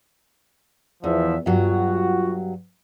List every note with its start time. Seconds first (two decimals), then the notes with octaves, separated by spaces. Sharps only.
1.04 E2 E3 F3 E5
1.46 G2 F#3 F4 F#4